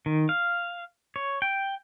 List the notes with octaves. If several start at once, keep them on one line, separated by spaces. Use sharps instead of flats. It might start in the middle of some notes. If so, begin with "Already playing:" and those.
D#3
F5
C#5
G5